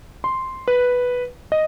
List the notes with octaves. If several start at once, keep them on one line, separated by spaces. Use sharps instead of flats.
C6
B4
D#5